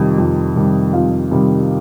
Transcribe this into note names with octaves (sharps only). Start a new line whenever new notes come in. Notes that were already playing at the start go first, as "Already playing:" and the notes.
Already playing: F2 C3 D#3 G3
F2
C3 D#3 G3
F2 F4
C3 D#3 G3